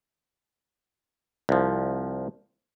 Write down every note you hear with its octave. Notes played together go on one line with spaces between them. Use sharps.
C2 F3